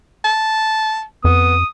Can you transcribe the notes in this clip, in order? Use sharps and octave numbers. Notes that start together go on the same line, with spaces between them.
A5
F2 B3 D#6